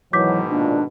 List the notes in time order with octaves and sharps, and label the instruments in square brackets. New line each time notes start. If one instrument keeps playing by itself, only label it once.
[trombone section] G#2 B2 D#3 [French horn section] E3 F#3 [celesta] D6 G6 B6
[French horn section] A#2 [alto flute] D4